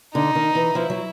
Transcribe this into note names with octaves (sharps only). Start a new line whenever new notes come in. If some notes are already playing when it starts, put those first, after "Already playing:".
D3 D#4
D#3
E3
F3 E4
F#3